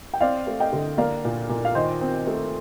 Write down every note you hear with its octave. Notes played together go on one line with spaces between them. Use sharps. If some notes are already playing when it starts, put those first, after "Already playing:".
G5
C4 D5 F5
A3
D#5 G5
D3
A#3 D5 F5
A#2
A#2
F5
D#3 C5 D#5
C4
A3